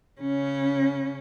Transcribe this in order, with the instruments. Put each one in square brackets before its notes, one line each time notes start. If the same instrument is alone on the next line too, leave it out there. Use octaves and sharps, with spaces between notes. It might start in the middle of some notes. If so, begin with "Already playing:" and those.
[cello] C#3 C#4